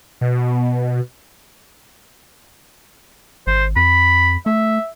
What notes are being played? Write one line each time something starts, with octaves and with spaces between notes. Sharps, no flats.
B2
G#1 C5
F2 B5
A3 E5